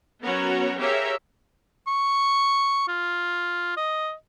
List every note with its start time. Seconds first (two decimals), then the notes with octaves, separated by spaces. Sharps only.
0.22 F#3 B3 C#4 F#4 A#4 C#5
0.78 G4 G#4 A#4 C#5 E5 F5
1.87 C#6
2.88 F4
3.77 D#5